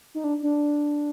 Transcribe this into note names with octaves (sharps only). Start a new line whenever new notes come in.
D#4
D4
D4